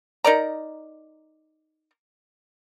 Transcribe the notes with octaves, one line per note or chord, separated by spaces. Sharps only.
D#4 A#4 D5 A#5